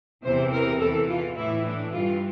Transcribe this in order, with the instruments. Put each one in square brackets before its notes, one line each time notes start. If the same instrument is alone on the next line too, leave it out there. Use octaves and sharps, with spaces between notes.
[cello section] E2 C3 E3 C5
A#4
E2 E3 A4
F4
A2 E3 E4
D4
G2 E3 F4